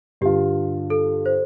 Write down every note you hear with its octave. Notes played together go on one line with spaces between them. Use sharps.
G2 D3 G3 F4 G4
A4
C5